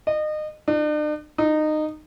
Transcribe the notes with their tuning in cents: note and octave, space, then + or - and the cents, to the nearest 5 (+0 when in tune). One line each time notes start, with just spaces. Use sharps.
D#5 -30
D4 +45
D#4 -20